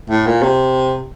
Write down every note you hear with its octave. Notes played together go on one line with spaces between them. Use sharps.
A2
A#2
C3